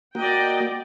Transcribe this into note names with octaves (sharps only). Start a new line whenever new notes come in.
A#3 F#4 D5 D#5 G5